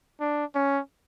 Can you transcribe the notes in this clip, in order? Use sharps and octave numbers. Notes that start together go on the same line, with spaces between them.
D4
C#4